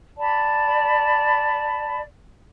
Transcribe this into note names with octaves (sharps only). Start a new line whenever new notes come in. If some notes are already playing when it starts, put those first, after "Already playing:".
D5 A5 B5